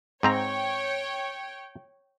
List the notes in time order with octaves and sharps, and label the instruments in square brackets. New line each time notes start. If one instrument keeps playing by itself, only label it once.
[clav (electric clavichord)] G#2 C4 A#5 [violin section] C#5 G5